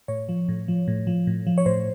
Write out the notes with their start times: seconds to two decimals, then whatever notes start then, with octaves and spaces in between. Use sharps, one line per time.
0.08 A2 C#5
0.29 F3
0.49 A2
0.68 F3
0.88 A2
1.07 F3
1.27 A2
1.47 F3
1.58 C#5
1.66 A2 C5